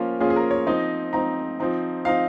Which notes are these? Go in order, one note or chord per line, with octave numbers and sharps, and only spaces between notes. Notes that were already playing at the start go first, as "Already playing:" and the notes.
Already playing: F3 A#3 C#4 F4 A#4
F3 A#3 C#4 F4 G#4
G#4
A#4
C#5
F3 C4 D#4 D#5
F3 C4 D#4 A#5
F3 C4 D#4
F3 C4 D#4 F5